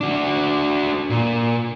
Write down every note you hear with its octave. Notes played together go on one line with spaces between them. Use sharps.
D4 F#4
A#2